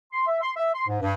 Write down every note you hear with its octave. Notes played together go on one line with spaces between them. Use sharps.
C6
E5
C6
E5
C6
G#2
G2